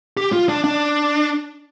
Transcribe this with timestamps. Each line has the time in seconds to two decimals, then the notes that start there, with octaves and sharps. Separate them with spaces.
0.17 G4
0.32 F4
0.49 D4
0.64 D4